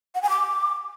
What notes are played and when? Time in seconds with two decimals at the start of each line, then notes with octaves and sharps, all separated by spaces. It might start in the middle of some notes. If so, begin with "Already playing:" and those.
0.15 F#5
0.22 G#5
0.30 D6